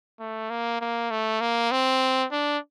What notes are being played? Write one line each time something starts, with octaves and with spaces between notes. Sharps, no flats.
A3
A#3
A#3
A3
A#3
C4
D4